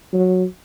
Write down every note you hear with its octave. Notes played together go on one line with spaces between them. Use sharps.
F#3